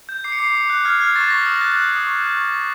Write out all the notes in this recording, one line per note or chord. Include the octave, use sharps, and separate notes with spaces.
G6
D6 C7
C#7
D6 C7
D6
F#6
F6 G#6
F6 G#6
C#6 A6
C#6 A#6
D#6 A#6
F#6 A6
F#6
D#6
C#6
F#6
C#6
C#6